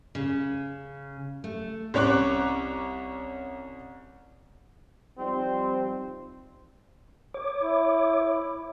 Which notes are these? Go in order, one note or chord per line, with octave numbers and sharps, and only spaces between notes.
C#3
A3
C2 C#4 C#5 C#6 D6 F#6
F3 G3 C4 D#4
C#5 D6
E4